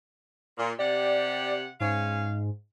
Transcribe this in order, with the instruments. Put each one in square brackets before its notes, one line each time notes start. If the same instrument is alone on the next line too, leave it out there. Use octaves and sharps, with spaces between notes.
[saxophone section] A#2
[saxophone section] C3 G4 F#5 [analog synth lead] D5
[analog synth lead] G#2 [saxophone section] C#4 F5